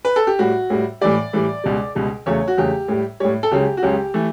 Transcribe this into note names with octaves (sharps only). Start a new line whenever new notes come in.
B4
A4
G4
A2 G3 F#4
A2 G3
A2 E3 G3 D5
A2 E3 G3
C#2 B2 G3
C#2 B2 G3
E2 C#3 F#3 A3 C#5
F#4
E2 C#3 F#3 A3 G4
A2 G3
A2 G3 C#5
A4
C#2 C#3 F#3 G4
F#4
C#2 C#3 F#3 G4
E3 A3